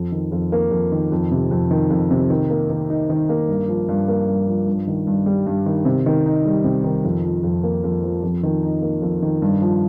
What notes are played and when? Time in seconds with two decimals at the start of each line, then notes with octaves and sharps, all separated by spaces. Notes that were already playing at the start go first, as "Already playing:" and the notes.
Already playing: F2
0.12 D#3
0.32 F2
0.52 A#3
0.71 F2
0.92 D#3
1.12 F2
1.31 C3
1.51 F2
1.71 D#3
1.90 F2
2.11 C3
2.30 D#3
2.50 A#3
2.70 D#3
2.90 D#4
3.10 D#3
3.29 A#3
3.49 G2
3.68 F3
3.89 G2
4.08 A#3
4.28 G2
4.47 F3
4.67 G2
4.87 D#3
5.07 G2
5.26 G3
5.47 G2
5.66 D#3
5.85 C3
6.06 D#3
6.26 D#4
6.46 G3
6.64 C3
6.84 D#3
7.04 F2
7.24 F3
7.43 F2
7.63 A#3
7.84 F2
8.03 F3
8.23 F2
8.43 D#3
8.63 D#4
8.82 A#3
9.02 F2
9.22 D#3
9.42 G2
9.62 F3